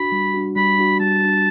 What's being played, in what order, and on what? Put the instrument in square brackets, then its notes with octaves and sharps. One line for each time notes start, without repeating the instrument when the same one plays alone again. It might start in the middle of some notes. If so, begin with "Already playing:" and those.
Already playing: [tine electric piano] D4 F#4 [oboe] B5
[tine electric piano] G3
D4 F#4
[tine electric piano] G3 [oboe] B5
[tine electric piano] D4 F#4
[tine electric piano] G3 [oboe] A5
[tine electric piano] D4 F#4